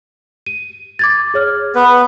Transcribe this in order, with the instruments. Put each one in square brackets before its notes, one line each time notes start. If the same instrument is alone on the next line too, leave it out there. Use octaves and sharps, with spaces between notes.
[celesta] D#7
D6 G#6 A6
G#4 C#5 F6
[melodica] B3 B4